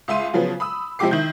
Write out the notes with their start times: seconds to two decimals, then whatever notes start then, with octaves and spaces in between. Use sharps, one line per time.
0.08 C#2 E5 C6 D#7
0.33 C#3 F3 F#3 B3
0.60 B5 D#6 E6
0.99 C3 F3 G#3 G4 D6 C7
1.11 D#3 E4 G6